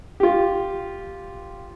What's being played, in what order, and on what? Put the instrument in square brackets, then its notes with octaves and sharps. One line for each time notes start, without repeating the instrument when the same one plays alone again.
[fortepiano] F4 G4